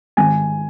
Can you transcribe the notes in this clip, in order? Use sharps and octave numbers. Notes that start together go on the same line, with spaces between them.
G#1 G#5